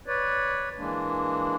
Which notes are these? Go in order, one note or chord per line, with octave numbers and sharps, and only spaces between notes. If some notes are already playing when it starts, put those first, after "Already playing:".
B4 C#5 D5
E3 G#3 A#3 D4